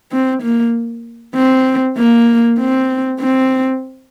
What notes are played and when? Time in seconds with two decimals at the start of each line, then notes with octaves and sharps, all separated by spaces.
0.12 C4
0.43 A#3
1.35 C4
1.97 A#3
2.59 C4
3.20 C4